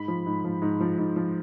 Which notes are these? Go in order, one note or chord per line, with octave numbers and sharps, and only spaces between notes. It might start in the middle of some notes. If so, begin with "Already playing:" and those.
Already playing: G#2 B5
F3
G#2
F3
G#2
F3
G#2
F3